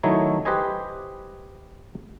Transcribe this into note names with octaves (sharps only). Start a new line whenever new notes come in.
D#3 F#3 A3 D#4 E4 C#5
G4 B4 C5 D#5 G#5